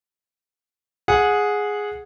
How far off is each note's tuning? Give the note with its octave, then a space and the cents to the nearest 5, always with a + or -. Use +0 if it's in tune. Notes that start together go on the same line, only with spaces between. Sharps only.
G#4 +0 F#5 -20